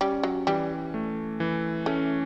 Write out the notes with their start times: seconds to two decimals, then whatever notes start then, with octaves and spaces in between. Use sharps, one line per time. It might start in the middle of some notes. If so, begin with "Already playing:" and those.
0.01 G3 C#4
0.23 F#3
0.47 E3 G3
0.94 A3
1.40 E3
1.86 A3 C#4